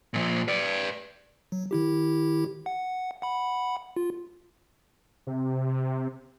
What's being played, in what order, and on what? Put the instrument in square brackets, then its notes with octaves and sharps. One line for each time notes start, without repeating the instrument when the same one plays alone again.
[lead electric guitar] A#2 F3
B4 D5
[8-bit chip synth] F#3
D#3 E4 G4
F#5
F#5 B5
F4
[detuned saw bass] C3